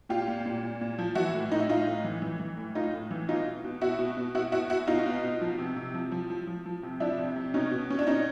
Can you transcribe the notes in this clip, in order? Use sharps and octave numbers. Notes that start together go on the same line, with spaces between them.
A#2 F4 G4
A#2
A#2
A#2
A#2
F3
E3 E4 F#4
A2
A2 D#4
E4
A2 D#4 F4
A2
E3
E3
E3
A2
A2 D#4 F4
A2
E3
B2 D#4 F4
B2
B2
B2 E4 F#4
B2
B2
B2 E4 F#4
B2 E4 F#4
B2 E4 F#4
B2 D#4 F4
B2
B2
F3
C3
C3
F3
F3
F3
F3
F3
C3
F3 D4 E4
C3
C3
B2 C#4 D#4
B2
B2 C#4
D4
B2 C#4 D#4